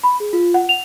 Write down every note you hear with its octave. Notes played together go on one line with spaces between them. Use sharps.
B5
G#4
F4
F#5
F7